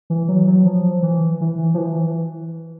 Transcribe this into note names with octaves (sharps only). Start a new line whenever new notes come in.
E3
F#3
F#3
F3
E3
E3
F3
E3